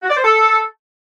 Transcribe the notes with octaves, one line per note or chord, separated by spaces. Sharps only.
F#4
D5
C5
A4